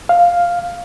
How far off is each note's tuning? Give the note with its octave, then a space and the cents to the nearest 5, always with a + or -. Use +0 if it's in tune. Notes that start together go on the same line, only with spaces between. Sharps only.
F5 +0